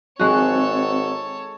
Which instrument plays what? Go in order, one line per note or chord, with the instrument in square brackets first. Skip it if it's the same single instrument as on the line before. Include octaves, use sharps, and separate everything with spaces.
[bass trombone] G#1 [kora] G#3 F#4 [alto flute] C4 [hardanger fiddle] A4 C#5